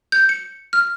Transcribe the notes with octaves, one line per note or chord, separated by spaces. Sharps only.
G6
C#7
F6